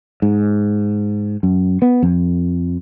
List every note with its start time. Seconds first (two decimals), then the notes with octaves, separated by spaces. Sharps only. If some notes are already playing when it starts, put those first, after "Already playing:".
0.22 G#2
1.43 F#2
1.82 B3
2.03 F2